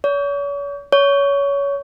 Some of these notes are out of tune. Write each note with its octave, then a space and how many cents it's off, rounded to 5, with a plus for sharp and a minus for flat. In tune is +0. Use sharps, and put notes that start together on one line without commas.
C#5 +40
C#5 +20